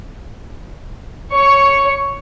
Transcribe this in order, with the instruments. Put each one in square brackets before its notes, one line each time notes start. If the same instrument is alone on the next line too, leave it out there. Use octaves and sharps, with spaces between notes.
[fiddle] C#5 C#6